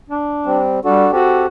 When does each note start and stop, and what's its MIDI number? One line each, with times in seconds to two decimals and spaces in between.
0.10 0.61 62
0.46 0.80 55
0.46 0.80 60
0.85 1.06 55
0.85 1.11 62
0.85 1.11 66
0.85 1.11 69
1.12 1.46 60
1.12 1.47 66
1.12 1.46 67
1.12 1.46 69